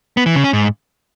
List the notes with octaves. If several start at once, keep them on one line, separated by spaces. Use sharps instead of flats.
B3
E3
C#3
C#4
G#2